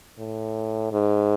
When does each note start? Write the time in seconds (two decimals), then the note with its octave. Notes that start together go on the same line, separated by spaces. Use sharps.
0.19 A2
0.92 G#2